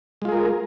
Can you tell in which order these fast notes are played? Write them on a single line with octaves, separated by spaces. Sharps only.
G#3 F4 G#4 A#4